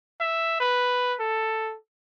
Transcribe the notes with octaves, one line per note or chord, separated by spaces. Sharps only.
E5
B4
A4